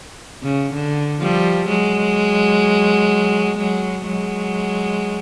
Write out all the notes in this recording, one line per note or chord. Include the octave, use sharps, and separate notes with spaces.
C#3
D3
F3 G3
F#3 G#3
F#3 G#3
F#3 G#3